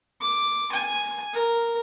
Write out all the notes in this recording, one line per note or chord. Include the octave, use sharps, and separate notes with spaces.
D6
G#5
A#4